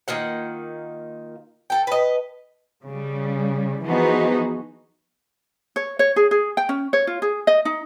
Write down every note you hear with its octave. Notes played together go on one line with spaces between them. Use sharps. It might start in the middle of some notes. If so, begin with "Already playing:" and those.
D#3 A#3 F4 F#5
A4 G5
B4 D#5
C#3 G3
E3 F3 B3 D#4 F#4 G#4
C#5
C#5
G#4
G#4
G5
C#4
C#5
F4
G#4
D#5
D#4